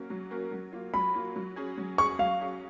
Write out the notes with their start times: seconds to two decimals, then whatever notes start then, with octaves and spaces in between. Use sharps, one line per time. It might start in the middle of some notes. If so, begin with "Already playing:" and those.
Already playing: F#3 A#3 C#4 F#4 A#4
0.10 F#3
0.31 A#3 C#4 F#4 A#4
0.51 F#3
0.73 A#3 F4
0.94 F#3 B5
1.14 A#3 F4
1.36 F#3
1.56 C#4 G#4
1.77 F#3
1.98 C#4 G#4 C#6
2.19 F#3 F5
2.41 C#4 G#4